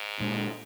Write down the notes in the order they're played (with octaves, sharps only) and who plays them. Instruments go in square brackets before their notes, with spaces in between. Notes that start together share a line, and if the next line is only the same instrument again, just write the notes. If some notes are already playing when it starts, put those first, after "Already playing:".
Already playing: [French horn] G#2
[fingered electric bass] A#2 G#3 D4